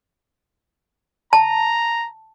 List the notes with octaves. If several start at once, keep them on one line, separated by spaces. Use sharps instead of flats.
A5 A#5